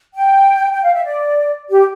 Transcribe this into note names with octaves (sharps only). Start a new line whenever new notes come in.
G5
G5
F5
E5
D5
G4